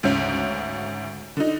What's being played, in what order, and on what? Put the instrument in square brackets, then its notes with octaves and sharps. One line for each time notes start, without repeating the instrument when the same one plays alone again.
[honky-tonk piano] D2 G#2 C#3 C#4
D3 D#4